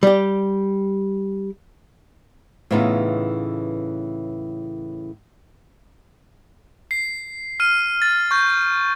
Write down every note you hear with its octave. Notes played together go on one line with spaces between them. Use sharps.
G3 G4
A2 C#3 E3 B3 D#4 F4
C7
F6 D#7
A6
C#6 G6